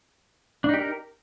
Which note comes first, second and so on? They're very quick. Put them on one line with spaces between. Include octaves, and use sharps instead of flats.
D4 D#4 G4 A#4